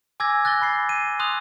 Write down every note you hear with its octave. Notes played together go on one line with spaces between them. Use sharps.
G#5 D6 E6 G#6 A#6
F#6 A6 A#6 G7
B5 F#6 C7
C7 D#7
C6 D#6 F#6 F7